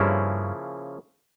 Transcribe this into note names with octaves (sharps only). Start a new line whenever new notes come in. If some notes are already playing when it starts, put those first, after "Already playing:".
Already playing: G2 C#3 F3 A#3 C#4 E4